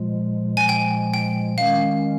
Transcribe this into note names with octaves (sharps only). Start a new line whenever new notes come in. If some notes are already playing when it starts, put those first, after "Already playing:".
Already playing: A#2 F3 G#3
G#5
G5
G5
D#3 G#3 C#4 F5